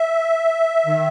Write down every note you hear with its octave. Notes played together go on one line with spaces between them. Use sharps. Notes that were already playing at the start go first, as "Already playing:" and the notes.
Already playing: E5
D#3